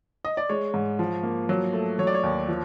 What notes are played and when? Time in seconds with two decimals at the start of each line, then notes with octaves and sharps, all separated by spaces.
0.25 D#5
0.37 D5
0.49 G#3 C#5
0.74 G#2
0.99 F3
1.23 A#3
1.49 F#3
1.73 A3
1.99 F#3 C#5
2.07 D5
2.15 C#5
2.23 D#2
2.48 F3